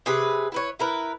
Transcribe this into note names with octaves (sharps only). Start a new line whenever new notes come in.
C3 G#4 B4
E4 B4 C#5
E4 A#4 B4